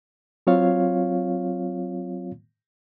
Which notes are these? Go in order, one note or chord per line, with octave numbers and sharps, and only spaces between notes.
F#3 C4 F4 C#5 F5